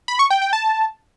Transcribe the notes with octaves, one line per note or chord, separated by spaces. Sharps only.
B5
C#6
G5
G5
A5